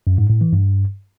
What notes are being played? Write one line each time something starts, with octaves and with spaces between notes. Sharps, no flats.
F#2
G#2
A2
E3
G2